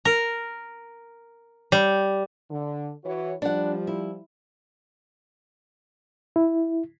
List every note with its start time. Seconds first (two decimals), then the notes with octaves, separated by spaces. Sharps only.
0.05 A#4
1.72 G3
2.50 D3
3.04 E3 F#4 C#5
3.42 F3 G3 D4 F#5
3.87 E4
6.36 E4